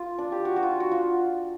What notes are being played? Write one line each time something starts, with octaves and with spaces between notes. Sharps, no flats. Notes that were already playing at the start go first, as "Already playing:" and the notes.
Already playing: F4
D4
G4
F#4
F#4
F4
F#4
F4